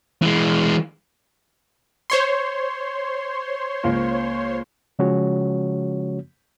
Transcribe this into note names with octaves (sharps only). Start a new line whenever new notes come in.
E3 G#3
C5 C#5 C6
C#2 A#3
C#3 F3 G#3 C#4 F#4 C#5